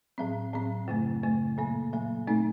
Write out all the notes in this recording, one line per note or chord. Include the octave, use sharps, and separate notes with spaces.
A2 F#3 C4
A2 F#3 C4
F#2 C#3 A3
F#2 C#3 A3
A#2 F#3 A#3
A#2 F#3 A#3
A#2 A3 C4 D#4